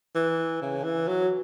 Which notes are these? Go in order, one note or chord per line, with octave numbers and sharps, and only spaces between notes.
E3
C#3
E3
F#3